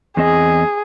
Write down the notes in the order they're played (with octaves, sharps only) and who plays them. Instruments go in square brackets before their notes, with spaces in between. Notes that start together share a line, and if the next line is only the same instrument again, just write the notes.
[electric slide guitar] E2 C4 D#5 [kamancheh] G#4